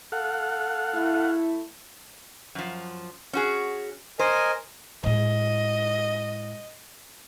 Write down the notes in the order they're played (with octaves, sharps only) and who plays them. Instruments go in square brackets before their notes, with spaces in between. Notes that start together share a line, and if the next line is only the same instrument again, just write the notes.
[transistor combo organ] A4 F5 F#5
[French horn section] A3 E4
[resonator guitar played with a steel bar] F#2 F3
C#4 F#4 G#4
[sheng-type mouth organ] A#4 D#5 G#5 [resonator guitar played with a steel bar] C5
[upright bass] A2 G#3 [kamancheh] D#5